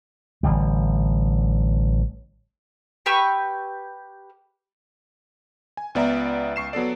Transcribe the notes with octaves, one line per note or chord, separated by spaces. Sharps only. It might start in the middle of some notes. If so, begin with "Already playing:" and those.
A1 D3 G3
G4 B4 C#6 E6
G#5
C#2 B3 D5 E5 A#5
C#2 C#6 C7 E7
F#3 B3 A4 D5